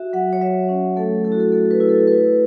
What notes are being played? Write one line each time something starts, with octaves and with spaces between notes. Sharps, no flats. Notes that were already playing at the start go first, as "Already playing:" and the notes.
Already playing: F#4 E5
F#3 F#5
C#5
F#3 E5
C#4
A3 A4
E4 A4
F#4
A4
A3 A4
B4
E4
A4
E4 B4